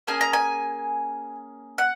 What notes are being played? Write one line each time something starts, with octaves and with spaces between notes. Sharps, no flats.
A#3 C#4 G#4 G#5
A#5
G#5
F#5